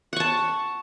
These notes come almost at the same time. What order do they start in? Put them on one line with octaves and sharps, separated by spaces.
F#5 C#6 A5